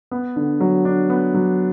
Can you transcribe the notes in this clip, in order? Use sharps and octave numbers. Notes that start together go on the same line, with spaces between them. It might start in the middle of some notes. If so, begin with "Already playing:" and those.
B3
D3
F#3
D4
B3
F#3